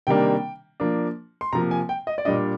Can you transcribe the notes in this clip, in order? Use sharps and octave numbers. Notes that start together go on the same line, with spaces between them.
C3 D#3 G3 A#3 D4 G5
F3 A#3 D4
C6
C3 F3 A#3 A#5
G#5
G5
D#5
D5
A#2 G3 D4 D#5